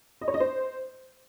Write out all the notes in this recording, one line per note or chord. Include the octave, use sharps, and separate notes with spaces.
D#5
C#5
D#5
C5